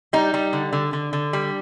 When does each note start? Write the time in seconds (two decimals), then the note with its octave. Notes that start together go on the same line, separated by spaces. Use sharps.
0.13 G3 D#4
0.34 G3
0.53 D3
0.73 D3
0.93 D3
1.13 D3
1.33 G3